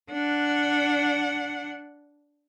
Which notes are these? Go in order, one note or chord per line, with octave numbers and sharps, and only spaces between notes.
D4 F#5